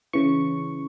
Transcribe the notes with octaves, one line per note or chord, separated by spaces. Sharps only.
C#3 E3 C#6